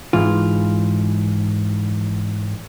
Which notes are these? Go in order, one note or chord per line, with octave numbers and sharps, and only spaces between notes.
G#2 E3 F4